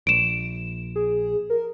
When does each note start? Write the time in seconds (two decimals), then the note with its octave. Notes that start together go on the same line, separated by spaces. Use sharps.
0.07 A#1 D7 E7
0.96 G#4
1.50 A#4